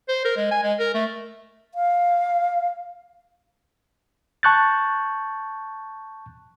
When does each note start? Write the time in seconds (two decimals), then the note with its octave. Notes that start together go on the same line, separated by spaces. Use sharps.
0.09 C5
0.25 A#4
0.37 G#3
0.51 G#5
0.63 G#3
0.79 A#4
0.94 A3
1.75 F5
4.43 A5 C#6 F#6 G6 A6